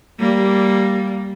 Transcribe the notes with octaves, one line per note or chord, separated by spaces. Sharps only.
G3 A#3